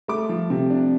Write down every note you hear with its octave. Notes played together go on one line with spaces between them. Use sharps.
A3 D6
F3
C3
D4